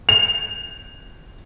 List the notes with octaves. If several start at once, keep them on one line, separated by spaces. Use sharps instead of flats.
F7